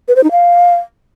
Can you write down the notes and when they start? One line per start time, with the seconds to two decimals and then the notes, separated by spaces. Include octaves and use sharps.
0.08 B4
0.16 C5
0.24 D#4
0.31 F5